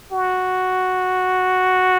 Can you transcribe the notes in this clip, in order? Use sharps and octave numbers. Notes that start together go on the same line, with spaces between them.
F#4